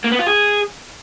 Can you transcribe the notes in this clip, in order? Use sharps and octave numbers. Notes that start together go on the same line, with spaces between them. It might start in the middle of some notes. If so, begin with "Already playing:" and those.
A#3
B3
F4
G#4